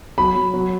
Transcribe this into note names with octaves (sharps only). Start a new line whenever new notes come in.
F#3 B5
F#3
F#3